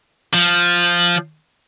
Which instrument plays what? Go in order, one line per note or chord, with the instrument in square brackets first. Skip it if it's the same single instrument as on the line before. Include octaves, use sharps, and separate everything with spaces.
[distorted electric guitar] F3